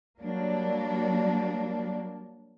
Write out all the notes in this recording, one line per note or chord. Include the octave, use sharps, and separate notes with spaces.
F#3 G3 A#3 D4